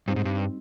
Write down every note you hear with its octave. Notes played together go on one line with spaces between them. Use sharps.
G2 G3 C4 D#4
G#2
G2